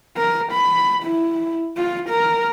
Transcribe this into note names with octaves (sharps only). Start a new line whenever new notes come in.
A#4
B5
E4
F4
A#4